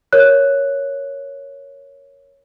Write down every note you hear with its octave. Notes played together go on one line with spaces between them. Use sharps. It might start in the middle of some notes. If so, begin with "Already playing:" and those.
A#4 C#5 F#6